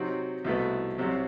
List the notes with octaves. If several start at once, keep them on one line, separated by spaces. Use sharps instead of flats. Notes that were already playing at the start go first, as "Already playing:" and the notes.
Already playing: C3 F#3 C4 D#4 F#4
C2 B2 A3 E4 B4
C2 C3 F#3 C4 F#4